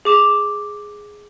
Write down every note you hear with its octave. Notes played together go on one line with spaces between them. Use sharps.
G#4 D6 E7 F7